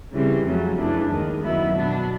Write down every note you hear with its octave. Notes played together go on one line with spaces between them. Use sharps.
C#3 E3 G3 C4
F2 C#3 F#3 A3
F#2 C#3 E3 A3 D4
D#2 D#3 G#3
F#2 D#3 F#3 B3 E4
B2 F#3 B3 D4